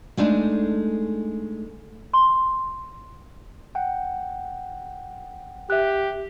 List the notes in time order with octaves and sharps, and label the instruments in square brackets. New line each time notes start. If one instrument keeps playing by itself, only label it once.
[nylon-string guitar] G#3 A3 D4 D#4
[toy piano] C6
[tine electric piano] F#5 G5
[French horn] G4 [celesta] E5 F#6